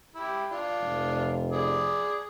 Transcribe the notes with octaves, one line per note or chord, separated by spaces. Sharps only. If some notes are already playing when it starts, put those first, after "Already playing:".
E4 G4
D4 F4
F1
G#4 D5